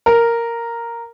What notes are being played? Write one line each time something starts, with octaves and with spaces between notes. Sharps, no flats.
A#4